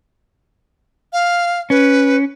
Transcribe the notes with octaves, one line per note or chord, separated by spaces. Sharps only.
F5
C#4 B4